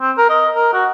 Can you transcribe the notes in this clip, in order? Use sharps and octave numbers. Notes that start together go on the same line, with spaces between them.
C4
A#4
D#5
A#4
F#4